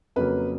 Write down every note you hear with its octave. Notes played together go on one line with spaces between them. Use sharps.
F2 C#3 F#3 A#3 B4